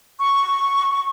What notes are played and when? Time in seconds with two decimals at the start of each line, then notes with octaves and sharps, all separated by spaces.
0.21 C#6